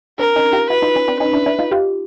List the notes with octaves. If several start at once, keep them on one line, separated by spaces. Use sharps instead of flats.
C4 D4 A#4
C#4 D#4
F4 G4
E4 F#4 B4
D#4 F4
C#4 D#4
C4 D4
C#4 D#4 B4
D4 E4
D4 E4
D#4 F4
F4 G4